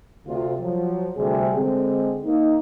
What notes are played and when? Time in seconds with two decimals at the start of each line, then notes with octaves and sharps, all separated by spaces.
0.27 D2 C3 F4
0.61 F3 F#3
1.16 D2 C3 G3 G#4
1.56 D3 G#3 C4
2.25 A#3 D#4